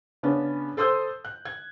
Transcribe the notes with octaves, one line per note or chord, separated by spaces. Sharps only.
C#3 B3 C#4 D4
A4 C5 C6 D#6 E6 G6
F#6
G#6